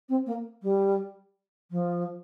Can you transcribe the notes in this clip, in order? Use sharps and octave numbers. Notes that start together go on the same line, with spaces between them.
C4
A#3
G3
F3